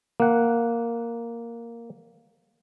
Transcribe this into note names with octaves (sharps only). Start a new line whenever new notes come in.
A#3 F#5